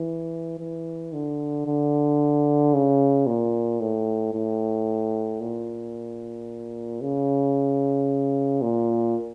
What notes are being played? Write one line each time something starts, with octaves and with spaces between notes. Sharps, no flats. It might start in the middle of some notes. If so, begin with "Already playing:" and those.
Already playing: E3
E3
D3
D3
C#3
A#2
A2
A2
A#2
C#3
A#2